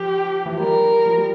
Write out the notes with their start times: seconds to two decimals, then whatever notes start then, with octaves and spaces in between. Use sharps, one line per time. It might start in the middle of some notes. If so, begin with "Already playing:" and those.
Already playing: F3 G4
0.46 E3
0.52 F3
0.60 G3 A#4
1.06 F3
1.17 G3